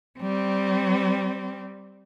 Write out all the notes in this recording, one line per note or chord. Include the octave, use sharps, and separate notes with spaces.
G3 C4